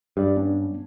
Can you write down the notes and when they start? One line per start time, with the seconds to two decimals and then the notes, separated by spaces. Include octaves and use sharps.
0.17 G2 G4 D5
0.36 B3 C#4 D4